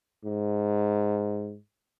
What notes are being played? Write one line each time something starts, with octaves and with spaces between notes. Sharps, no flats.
G#2